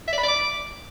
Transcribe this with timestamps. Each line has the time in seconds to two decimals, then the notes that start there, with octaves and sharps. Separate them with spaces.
0.07 E5
0.13 D5
0.18 B5
0.23 D5
0.28 D6